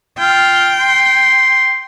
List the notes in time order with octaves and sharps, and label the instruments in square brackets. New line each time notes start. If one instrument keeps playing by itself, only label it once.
[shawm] F4 [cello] G5
[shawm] C6